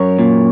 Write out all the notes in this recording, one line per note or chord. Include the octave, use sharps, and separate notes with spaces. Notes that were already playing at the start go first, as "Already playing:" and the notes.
Already playing: F#2 A#4 C#5
A#2